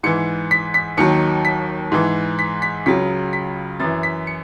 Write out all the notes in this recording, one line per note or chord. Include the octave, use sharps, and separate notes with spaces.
G#2 E3 C#7
B6
B6
D#2 D#3 F#3 C#7
B6
G#2 E3
B6
B6
C#2 C#3 F#3 B6
B6
F#2 E3 A6
B6
C#7